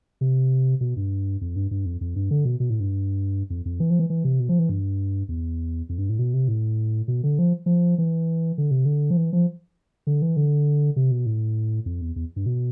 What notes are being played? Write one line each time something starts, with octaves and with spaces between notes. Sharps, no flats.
C3
B2
G2
F2
G2
G2
F2
F2
G2
D3
B2
B2
A2
G2
F2
F2
E3
F3
E3
E3
C3
B2
F3
E3
G2
E2
F2
G2
A2
B2
C3
A2
B2
D3
F3
F3
E3
D3
C3
D3
F3
E3
F3
D3
E3
D3
C3
B2
A2
F2
E2
E2
G2
B2